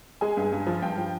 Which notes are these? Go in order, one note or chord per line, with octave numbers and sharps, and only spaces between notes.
G#3 G#5
G2
G2
F3
G2 G5
F3